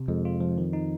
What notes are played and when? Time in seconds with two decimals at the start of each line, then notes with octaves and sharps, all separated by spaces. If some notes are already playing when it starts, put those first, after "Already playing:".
Already playing: C3
0.08 F2 G#3
0.25 F4
0.40 F3
0.58 D#3
0.73 D#4